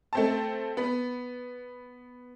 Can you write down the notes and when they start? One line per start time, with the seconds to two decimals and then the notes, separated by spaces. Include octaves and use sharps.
0.13 A3 C4 A5
0.77 B3